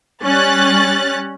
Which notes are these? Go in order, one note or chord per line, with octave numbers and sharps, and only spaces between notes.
G3 C#4 F#6 A6